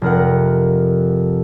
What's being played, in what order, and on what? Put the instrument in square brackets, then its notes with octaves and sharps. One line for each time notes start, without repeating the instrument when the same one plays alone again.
[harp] F1 A#4 F#5